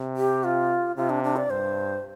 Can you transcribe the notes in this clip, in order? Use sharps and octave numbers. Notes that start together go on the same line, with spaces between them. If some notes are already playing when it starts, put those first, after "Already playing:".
Already playing: C3
G4
F4
C3 F4
D4
D4
D5
G2 C5